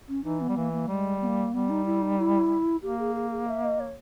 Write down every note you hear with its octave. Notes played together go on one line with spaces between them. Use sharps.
C#4
E3 D#4
B3
G3
E3 A#3
A#3
G3 G#3
B3
A#3
G3 B3
D#4
E4
D#4
E4
A#3 G4
G#4
G#4
G#4
E5
D#5
C#5